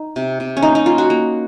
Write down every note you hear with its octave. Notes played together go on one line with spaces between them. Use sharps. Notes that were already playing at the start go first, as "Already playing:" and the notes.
Already playing: D#4
C3
C3
C#4
A#3 D#4
D#4
A#3 F4
F#4
A#3